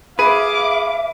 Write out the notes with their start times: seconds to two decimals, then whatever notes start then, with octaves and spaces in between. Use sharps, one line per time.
0.19 G#4 B4 E5 F5 D6 D#7